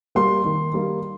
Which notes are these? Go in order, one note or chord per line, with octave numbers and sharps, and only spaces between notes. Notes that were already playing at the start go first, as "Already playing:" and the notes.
G3 A#3 C6
D#3
G3 A#3